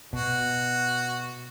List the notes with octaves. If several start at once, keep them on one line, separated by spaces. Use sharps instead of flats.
B2 F#4